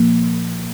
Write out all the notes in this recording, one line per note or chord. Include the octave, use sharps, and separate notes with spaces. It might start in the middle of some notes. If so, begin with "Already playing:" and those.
Already playing: A#2 F3 A#3